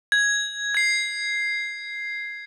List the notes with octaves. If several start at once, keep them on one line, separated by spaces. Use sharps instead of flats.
G#6
G#6 C7